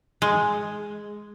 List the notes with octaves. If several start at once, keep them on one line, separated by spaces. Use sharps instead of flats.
G#3